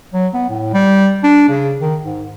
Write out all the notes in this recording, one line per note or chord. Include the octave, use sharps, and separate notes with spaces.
F#3
B3
A2
G3
D4
C#3
D#3
G#2